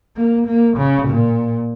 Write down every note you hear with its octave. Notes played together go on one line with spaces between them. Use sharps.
A#3
A#3
C#3
A#2